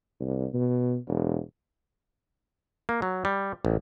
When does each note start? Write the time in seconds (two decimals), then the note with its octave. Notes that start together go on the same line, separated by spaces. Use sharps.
0.20 C2
0.54 B2
1.08 E1
2.89 A#3
3.02 F#3
3.25 G3
3.65 A1